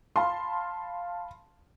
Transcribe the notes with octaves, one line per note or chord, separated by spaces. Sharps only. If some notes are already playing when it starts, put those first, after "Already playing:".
F5 A5 B5 C6